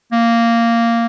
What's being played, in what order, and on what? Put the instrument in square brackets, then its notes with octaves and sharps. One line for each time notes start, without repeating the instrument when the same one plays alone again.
[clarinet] A#3